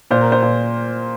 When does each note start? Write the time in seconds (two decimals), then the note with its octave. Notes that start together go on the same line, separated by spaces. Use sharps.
0.11 A#2 C5
0.22 A#4
0.32 C5
0.42 A#2